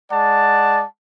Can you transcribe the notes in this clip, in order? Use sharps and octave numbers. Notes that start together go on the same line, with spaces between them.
G#3 D5 F#5 A5